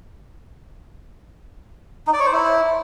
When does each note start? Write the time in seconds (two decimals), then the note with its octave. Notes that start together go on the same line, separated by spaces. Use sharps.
2.07 D#4
2.13 D5
2.20 C#5
2.26 C5
2.33 E4